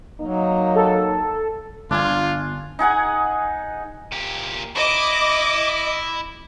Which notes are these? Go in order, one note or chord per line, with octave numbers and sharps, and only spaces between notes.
F#3 A#3 D#4
A4
G1 D4 F4 D5 G#5
D#4 G#4 F#5 G#5
A#2 G4
E4 D#5 D6